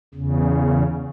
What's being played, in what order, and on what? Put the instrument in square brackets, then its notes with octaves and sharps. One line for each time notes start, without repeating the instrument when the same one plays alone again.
[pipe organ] E2 C#3